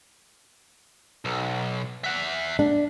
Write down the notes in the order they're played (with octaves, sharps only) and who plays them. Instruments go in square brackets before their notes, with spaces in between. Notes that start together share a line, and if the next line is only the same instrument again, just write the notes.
[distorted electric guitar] B1
E5 F#5
[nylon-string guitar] D4